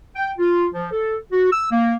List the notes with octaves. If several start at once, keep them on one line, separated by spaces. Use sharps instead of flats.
G5
F4
F3
A4
F#4
E6
A#3